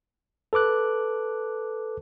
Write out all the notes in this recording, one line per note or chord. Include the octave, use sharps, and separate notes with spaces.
A4 B4 D6 F#6